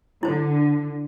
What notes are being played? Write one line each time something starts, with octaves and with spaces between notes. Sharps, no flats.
D3 E4 C5